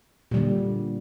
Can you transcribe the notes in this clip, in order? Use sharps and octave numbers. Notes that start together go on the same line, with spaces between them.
A#2 D3 G3